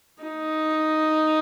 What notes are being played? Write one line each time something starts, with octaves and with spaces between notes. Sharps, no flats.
D#4